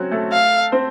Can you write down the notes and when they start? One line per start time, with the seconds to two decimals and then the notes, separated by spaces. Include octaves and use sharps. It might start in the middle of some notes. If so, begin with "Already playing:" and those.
Already playing: F#3 C4 C#4 F#4
0.11 A3 A4
0.32 F5
0.72 C4 C5